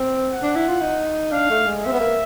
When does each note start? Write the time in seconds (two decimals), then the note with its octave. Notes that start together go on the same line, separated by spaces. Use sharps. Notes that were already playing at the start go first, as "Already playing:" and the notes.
Already playing: C4
0.31 F#5
0.43 D4
0.56 E4
0.68 F4
0.81 D#4
1.32 D4 F5
1.50 A3
1.66 G#3
1.83 C4 E5
1.93 B3
2.00 A#3